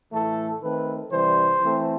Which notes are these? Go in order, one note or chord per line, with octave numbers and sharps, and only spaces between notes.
A2 E3 A3 A4
D#3 A3 C4 B4
C3 E3 G3 C5
E3 A3 C4